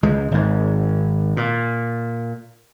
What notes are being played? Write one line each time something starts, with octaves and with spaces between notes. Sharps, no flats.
C#2 G#3
G#1 G#2
A#2